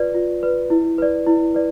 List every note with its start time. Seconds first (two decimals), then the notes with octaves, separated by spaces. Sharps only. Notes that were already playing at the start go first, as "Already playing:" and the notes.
Already playing: F4 B4 D5
0.14 F4
0.43 B4 D5
0.70 E4
0.98 B4 D5
1.27 E4
1.55 B4 D5